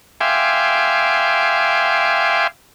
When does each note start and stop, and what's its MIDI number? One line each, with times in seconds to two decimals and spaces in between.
0.21 2.47 76
0.21 2.47 77
0.21 2.47 79
0.21 2.47 80
0.21 2.47 84
0.21 2.47 86